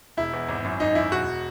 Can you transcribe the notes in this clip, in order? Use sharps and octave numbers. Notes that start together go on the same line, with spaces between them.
E1 E4
E2
G#1
F#2
G#1 D#4
F#2 E4
E1 F#4